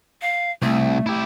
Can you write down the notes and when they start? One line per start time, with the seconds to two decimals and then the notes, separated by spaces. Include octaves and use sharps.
0.22 F5
0.62 C2 A3
1.06 E4 G4